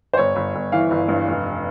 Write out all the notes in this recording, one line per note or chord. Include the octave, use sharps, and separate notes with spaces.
C5
G1 C#5
G1
G1
E3 F5
G1
G2
F1